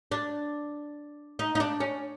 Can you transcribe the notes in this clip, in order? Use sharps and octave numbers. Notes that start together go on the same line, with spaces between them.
D4
D#4
D#4
D4
C#4